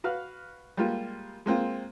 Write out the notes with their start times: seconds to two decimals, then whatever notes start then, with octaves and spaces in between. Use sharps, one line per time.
0.04 F#4 B4 F5 F6
0.77 G3 G#3 A#3 F4
1.46 G#3 A#3 C4 F4